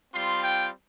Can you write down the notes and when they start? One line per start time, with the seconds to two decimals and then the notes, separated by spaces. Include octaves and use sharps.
0.14 G3 C4 F4 C6
0.42 G5